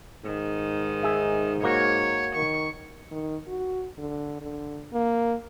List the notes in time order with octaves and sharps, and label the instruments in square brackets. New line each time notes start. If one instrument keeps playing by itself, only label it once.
[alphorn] G#2 [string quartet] D#3
[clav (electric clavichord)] G#4 E5
[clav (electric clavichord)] A#3 F#4 [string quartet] C#5
[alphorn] D#3 [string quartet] C#6
[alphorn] D#3
F#4
D3
D3
A#3